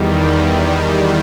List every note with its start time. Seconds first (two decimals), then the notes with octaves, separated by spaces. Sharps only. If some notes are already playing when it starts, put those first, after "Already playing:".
Already playing: E2 D#3 G3
0.27 B4 D#5